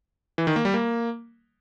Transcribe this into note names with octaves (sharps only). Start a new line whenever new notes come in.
E3
D#3
A#3
G3
A#3